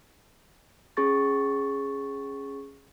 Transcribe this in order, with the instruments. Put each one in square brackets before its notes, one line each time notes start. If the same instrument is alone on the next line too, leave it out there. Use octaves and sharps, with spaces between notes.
[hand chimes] C#4 G#4 C#6 A6